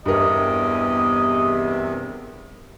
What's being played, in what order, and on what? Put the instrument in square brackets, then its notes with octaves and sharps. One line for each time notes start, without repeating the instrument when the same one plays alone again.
[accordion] E2 C3 [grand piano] G2 A#4 [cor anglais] D#5